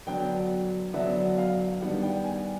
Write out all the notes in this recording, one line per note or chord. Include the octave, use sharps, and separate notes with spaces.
D3 F#3 B3 D4 G5
D3 F#3 B3 D4 E5
F5
D#3 G3 B3 D4 F#5
G5
G#5